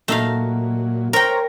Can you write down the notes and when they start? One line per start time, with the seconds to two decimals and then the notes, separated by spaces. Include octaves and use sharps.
0.08 A#2 F#3 A3 D#4 F5
1.13 A#4 C5 C#5 G5 A#5